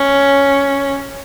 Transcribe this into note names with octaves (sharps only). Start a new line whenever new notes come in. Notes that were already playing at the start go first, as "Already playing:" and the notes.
Already playing: C#4